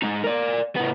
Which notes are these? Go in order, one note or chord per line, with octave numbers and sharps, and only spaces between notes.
G#3 D#4
A#4 D5
A2 B3